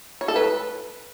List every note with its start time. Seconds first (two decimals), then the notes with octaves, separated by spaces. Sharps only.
0.21 C#5
0.28 A4
0.36 B4